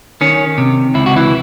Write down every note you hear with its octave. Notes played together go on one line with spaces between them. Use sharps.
D#3 C#4
C3
C#2 E4
F#4
E3 E4